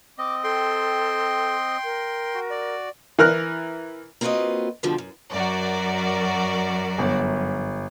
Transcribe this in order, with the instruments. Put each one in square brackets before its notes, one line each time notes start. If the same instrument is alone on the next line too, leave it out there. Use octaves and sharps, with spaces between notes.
[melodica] C4 D#5 [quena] D6
[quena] A4 [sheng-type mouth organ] G5 C6
[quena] A#4
[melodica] F#4
[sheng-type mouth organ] D5
[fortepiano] E3 A#4 F6 F#6
[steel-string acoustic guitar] A#3 C4 F4 F#4 B4 D#5
F2 B2 D3 F3 G3
F#2
[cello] F#2 [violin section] F#4 A#4 D5
[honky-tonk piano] G1